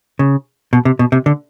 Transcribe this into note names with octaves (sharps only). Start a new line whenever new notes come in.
C#3
B2
C3
B2
C3
D3